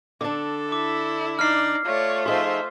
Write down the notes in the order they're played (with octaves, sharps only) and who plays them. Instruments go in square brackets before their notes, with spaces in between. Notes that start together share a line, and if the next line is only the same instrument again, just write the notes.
[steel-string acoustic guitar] D3 D4 [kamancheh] A4 [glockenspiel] D6
[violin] E4 [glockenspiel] D6
[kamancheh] D#4 D5 [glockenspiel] F6 C7
[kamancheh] A3 F4 [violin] C#5 D5
[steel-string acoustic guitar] F3 D#4 G#4 [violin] C5 E5 [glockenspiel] C6